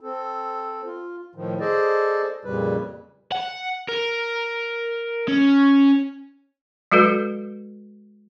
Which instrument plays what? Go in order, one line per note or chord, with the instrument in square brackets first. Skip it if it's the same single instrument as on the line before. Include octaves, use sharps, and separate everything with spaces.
[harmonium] C4 A4
F4
A2 D#3 F3
G#4 A4 C5 D5 D#5
F2 A#2 C#3 G3 B4
[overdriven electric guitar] F#5
A#4
C#4
[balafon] F#3 G#3 F#4 A4 B4